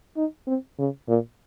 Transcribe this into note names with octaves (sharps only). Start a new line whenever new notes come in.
D#4
C4
C#3
A#2